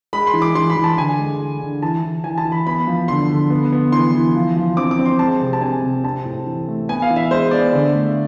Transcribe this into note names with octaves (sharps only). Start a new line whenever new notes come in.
G#3 B5
C6
E3
D6
E3 C6
B5
E3
A5
D3 G#5
G#3
G#3
D3
E3 A5
E3
E3 G#5
A5
E3
B5
B3 B5
F3
D3 C6
D3
B3
B3
E3 C6
E3
F3
F3
C4 D6
D6
C4
C6
G#3 A5
C3
A5
C4 G#5
C3
C4 A5
A2
E3
A3
B3 G#5
F5
E3
E5
G#3 C5
B3 D5
D3
A3